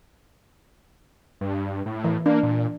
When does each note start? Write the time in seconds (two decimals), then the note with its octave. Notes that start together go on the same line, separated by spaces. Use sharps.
1.41 G2
1.86 A2
2.04 E3
2.26 A#3 D4
2.43 A#2